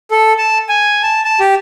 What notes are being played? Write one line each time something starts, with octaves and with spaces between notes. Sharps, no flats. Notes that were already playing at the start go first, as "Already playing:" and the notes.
A4
A5
G#5
A5
A5
G4